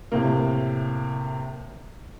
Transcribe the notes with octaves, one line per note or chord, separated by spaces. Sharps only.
A2 C3 A#3